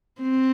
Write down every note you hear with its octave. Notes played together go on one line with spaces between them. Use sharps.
C4